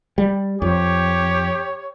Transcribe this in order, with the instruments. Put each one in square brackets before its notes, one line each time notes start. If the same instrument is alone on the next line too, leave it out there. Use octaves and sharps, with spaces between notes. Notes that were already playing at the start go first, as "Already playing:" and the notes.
[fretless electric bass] G3
[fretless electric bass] F2 [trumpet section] G4 C#5